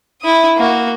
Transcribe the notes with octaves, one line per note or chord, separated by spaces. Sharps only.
E4 D#6
A#3 F#4